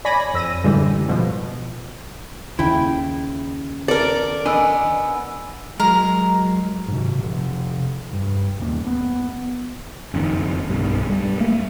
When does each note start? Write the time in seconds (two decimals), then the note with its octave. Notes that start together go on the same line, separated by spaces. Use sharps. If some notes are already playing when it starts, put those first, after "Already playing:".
0.05 C#5 D5 G#5 B5 A#6
0.34 F2 E6 A#6 D#7
0.64 F#2 A2 D3 E3 G3 G#3
1.08 B2 F3
2.59 D#2 C#3 E4 G5
3.88 A4 A#4 D5
4.45 B3 D4 D#5 G#5 E6
5.80 F#3 G#3 A#4
6.88 G#2 C3
7.20 C3 F3
8.13 G2
8.59 D#1 D#2 A#3 C#4
8.87 B3
10.14 F#1 F2 B2 D#3
10.69 B1 G2
11.09 G2 G3
11.40 A3 A#3